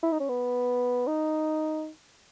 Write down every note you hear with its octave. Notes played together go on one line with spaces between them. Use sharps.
E4
D#4
C#4
B3
D#4